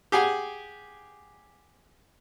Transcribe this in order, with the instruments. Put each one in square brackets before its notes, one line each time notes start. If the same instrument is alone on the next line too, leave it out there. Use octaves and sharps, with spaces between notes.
[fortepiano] G4 G#4 F#5 G#5